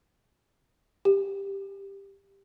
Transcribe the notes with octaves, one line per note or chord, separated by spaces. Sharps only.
G4